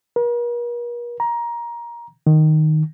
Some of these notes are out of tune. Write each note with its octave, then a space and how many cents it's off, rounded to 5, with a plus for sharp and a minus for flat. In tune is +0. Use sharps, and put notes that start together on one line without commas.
A#4 +45
A#5 +15
D#3 -5